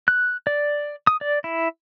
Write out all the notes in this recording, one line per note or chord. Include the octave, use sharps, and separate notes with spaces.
F#6
D5
D#6
D5
E4